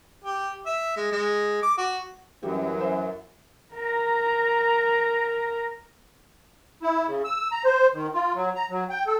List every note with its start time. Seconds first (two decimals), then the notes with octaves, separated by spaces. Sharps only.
0.24 G4
0.66 E5
0.96 G#3
1.12 G#3
1.62 D6
1.78 F#4
2.43 F#2 E3 G3 F#4 G4
2.81 C5 E5
3.74 A#4 A#5
6.82 E4
7.07 C#3
7.25 E6
7.52 A#5
7.65 C5
7.94 D#3
8.14 F4
8.35 F#3
8.56 A#5
8.70 F#3
8.90 G5
9.06 A4